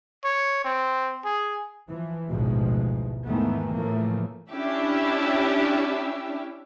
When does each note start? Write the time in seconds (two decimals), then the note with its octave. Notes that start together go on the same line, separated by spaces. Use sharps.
0.24 C#5
0.65 C4
1.25 G#4
1.87 E3 F3
2.30 A1 D2 G#2 B2 F3 G#3
3.27 E2 G#2 D#3 E3 A3 B3
3.75 A2 C#3 E3 F3 A3 A#3
4.52 C#4 D4 E4 G4 E5